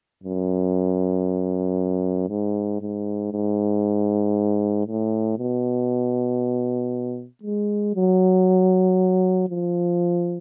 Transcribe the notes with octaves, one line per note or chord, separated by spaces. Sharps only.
F#2
G#2
G#2
G#2
A2
B2
G#3
F#3
F3